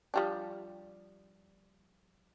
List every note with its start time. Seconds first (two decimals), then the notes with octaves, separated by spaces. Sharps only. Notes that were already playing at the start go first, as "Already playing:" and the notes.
0.14 F3 G3 D4